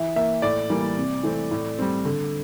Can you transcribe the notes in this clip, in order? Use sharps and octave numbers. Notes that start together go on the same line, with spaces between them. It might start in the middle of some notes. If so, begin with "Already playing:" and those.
Already playing: E3 E5
A#3 E5
A2 D5
E3 G3 A#3
C3
E3 A3 C4
A2
G3 C4
D3